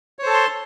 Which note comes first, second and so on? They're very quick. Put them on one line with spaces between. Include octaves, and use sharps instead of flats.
C#5 C5 A4 A5 C6